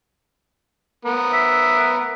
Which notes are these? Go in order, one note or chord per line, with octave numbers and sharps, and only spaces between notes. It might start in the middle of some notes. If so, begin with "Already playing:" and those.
B3 A#4
E5